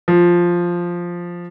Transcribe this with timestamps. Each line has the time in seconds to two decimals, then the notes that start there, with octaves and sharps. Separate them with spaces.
0.08 F3